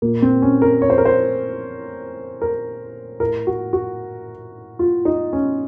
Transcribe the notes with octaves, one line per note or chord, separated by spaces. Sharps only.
A#2 A#3
C4
C#4
A#4
C#5
C5
A#4
C5
A#4
A2 A#4
F#4
F#4
F4
D#4
C#4